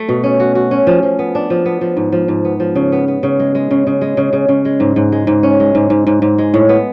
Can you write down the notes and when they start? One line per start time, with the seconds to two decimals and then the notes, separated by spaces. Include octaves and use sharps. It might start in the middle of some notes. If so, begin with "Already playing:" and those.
Already playing: A3
0.09 B2
0.24 C#4
0.40 F#4
0.55 F#4
0.71 C#4
0.87 F3
1.03 F3
1.19 B3
1.35 D4
1.50 F3
1.65 B3
1.81 F3
1.97 G#2
2.12 F3
2.28 G#2
2.45 B3
2.60 F3
2.75 C#3
2.92 B3
3.08 B3
3.23 C#3
3.39 G#3
3.55 G#3
3.71 C#3
3.87 C#3
4.01 G#3
4.17 C#3
4.33 C#3
4.48 C#3
4.65 G#3
4.80 G#2
4.96 G#2
5.12 G#3
5.27 G#2
5.43 C#4
5.60 G#3
5.75 G#2
5.90 G#2
6.07 G#2
6.22 G#2
6.38 G#3
6.54 A2
6.69 B3